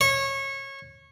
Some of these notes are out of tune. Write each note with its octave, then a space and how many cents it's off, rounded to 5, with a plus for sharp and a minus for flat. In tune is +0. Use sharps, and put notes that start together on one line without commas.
C#5 -25